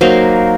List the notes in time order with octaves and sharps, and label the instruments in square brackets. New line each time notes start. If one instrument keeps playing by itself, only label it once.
[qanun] F#3 A#3 D#4 C5